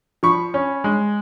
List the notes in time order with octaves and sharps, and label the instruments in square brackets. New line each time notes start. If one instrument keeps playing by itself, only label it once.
[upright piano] F3 B5 C#6
C#4
G#3